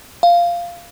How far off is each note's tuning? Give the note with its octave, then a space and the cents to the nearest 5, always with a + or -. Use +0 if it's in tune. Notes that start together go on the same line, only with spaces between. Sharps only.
F5 -10